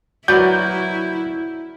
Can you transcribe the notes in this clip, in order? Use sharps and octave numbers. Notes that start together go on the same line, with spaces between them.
F#3 E4 F#4 A#4 B4 D5 G6